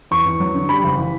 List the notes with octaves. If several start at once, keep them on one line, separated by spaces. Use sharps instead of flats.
E2 C#6
E2
F#3
D3
G3 B5
F#1
E3